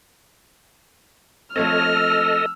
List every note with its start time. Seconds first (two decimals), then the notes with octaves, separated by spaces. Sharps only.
1.56 F3 A3 C4 A4 C#5 D#5 F6
1.97 E6